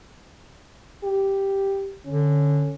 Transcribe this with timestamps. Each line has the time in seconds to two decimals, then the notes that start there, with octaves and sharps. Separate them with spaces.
1.04 G4
2.06 D3 C#4